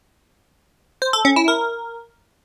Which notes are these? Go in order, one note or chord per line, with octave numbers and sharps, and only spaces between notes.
C5
A4
C#4
E4
A#4